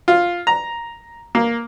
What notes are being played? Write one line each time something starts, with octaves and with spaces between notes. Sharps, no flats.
F4
A#5
A#3